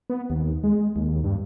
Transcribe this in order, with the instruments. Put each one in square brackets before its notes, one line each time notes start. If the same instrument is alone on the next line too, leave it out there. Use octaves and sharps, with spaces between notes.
[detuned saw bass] B3
D#2
G#3
D#2
G2